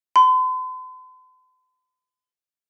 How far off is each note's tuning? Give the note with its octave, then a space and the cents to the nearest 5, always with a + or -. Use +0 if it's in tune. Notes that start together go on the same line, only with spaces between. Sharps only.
C6 -45